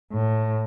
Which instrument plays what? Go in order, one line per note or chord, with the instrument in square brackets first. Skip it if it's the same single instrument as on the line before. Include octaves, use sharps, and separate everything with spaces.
[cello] A2